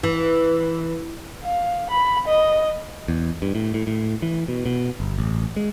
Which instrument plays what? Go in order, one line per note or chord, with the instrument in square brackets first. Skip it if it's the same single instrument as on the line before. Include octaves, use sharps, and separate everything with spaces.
[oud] E3
[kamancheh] F5
B5
D#5
[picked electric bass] E2
G2
A2
A2
A2
E3
B2
B2
G1
A1
G#3